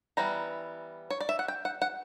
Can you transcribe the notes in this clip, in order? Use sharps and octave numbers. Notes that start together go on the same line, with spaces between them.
E3 G3 B3 A#5
C#5
D5
E5
F#5
G5
F#5
F#5